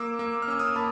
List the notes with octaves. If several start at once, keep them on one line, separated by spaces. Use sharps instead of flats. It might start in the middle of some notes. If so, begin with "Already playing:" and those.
Already playing: A#3 D6 E6
A#3
F6
C#4 E6
D#6 F6
A#3 A5 B5